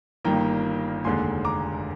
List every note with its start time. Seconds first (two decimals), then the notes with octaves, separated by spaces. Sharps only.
0.25 G1 G2 D#3 A#3 G5 A#5
1.04 F1 D#2 D3 G#3 G#5 C6
1.45 A#5 D6